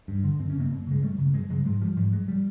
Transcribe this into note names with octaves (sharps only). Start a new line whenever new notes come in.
G2
D3
F#2 C4
C#4
C#3 A#3 C4
F#2
C#3 G#3
F#2 G3 A3
C#3
F#2 F#3 G#3
C#3 F#3 G#3
G#2 F#3 G#3
F3 G3
G#2 F3 G3
F#3 G#3
F3 G3